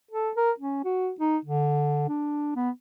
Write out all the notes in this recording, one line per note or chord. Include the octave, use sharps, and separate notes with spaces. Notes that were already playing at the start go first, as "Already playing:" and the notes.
A4
A#4
C#4
F#4
D#4
D3
D4
B3